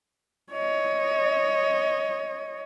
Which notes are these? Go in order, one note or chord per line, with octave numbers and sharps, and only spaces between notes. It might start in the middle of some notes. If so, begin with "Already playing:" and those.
C#5 D#5